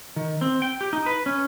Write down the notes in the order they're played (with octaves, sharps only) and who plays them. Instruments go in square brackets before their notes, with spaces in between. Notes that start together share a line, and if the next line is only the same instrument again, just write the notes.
[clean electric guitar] D#3
C4
G5
G4
D#4
B4
C#4